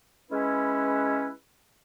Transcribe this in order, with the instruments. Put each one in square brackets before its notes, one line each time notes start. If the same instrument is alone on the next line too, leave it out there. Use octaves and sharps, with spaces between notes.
[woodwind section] G#3 C#4 E4 B4